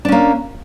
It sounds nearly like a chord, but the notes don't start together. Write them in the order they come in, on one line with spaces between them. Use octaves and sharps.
D4 C#4 A#3